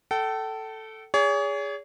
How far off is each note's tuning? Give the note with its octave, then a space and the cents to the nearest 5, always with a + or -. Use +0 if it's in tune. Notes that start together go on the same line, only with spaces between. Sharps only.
A4 +0 G5 -40
G#4 -15 C#5 +40